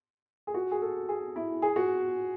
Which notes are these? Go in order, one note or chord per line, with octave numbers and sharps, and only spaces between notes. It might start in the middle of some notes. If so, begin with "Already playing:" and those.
G#4
F#4
G#4
A4
G#4
E4
G#4
F#4